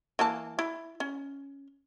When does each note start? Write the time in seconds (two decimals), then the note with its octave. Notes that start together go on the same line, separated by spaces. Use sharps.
0.19 E3 A#3 A5
0.59 E4
1.00 C#4